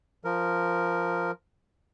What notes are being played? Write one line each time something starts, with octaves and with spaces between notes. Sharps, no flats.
F3 A#4